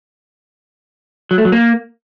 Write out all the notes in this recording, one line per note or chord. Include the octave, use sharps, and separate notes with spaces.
F#3
A3
F#3
A#3